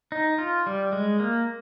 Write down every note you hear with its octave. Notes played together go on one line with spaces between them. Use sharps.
D#4
F4
G3
G#3
A#3